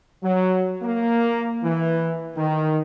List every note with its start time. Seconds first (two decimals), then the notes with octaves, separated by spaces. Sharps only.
0.22 F#3
0.81 A#3
1.62 E3
2.35 D#3